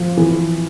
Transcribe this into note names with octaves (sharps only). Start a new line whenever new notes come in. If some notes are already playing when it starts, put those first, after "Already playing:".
Already playing: F3
E3